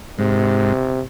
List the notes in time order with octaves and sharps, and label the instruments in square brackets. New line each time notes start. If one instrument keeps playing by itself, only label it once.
[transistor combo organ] G#2 [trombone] C3